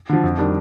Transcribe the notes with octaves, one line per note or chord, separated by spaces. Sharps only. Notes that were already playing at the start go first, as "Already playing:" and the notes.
D3 F3
F2
D#3 G3 D4